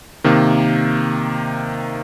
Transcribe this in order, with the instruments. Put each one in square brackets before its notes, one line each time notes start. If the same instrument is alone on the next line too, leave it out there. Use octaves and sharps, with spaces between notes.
[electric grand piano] C3 D#3 A#3